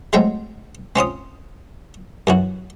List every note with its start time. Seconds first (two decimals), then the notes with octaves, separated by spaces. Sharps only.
0.13 F#3 G#3 A3 C4 G5
0.96 C4 C#4 F4 D#6
2.27 F#2 E3 F#4